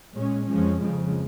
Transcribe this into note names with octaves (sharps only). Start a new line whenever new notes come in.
A#2 G#3 C#4
F2 F3 G#3 C#4
F2 C#3 F3 G#3